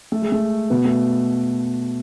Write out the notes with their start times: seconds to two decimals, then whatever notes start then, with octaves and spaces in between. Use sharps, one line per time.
0.12 A3
0.22 G#3
0.32 A3
0.70 B2 B3
0.85 A3